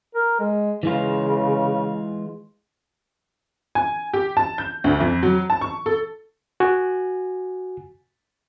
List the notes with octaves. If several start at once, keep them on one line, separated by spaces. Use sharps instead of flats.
A#4
G#3
C#3 E3 G#3 F4
G#5
G4
A5
G6
D2
F2
F#3
A5
C#6
A4
F#4 G#5